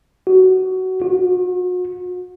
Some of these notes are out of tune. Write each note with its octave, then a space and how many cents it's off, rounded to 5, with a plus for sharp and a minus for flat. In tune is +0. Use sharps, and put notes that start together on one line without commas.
F#4 +15
F#4 -40